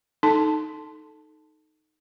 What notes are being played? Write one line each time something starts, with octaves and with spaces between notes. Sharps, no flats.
D#4 A4 A5